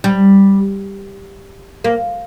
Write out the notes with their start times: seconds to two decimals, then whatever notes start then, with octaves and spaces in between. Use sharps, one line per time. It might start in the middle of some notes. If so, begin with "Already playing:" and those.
0.04 G3
1.84 A#3